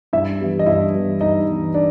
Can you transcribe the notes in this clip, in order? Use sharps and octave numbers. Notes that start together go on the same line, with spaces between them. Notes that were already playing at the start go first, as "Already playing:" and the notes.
G2 E4 E5
E3 G3 B3
D#5
G2 E4 E5
E3 G3 B3
G2 D#4 D#5
E3 G3 B3
D4 D5